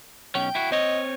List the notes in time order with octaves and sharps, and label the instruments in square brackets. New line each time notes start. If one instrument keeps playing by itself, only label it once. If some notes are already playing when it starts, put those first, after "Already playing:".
[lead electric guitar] B1 C#4 [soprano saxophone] G5
[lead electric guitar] E4 F#4
[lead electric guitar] C4 C#5 [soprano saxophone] D#5